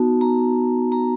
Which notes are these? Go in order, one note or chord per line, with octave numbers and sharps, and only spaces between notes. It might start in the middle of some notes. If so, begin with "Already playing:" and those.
Already playing: B3 D#4 F#4 A5
A#5
A#5